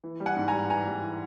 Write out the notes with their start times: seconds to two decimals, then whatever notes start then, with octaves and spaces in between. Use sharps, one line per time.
0.04 E3
0.20 G3
0.26 F#5 G#5
0.37 G#2
0.48 G#5 A#5
0.53 G3
0.70 E3 G#5 A#5
0.87 G3
1.03 E3